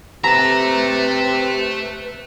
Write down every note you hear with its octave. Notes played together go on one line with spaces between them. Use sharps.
C3 B4 E5 A5 A#5